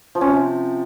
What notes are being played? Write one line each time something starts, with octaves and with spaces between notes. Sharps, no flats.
F3
C#4
C3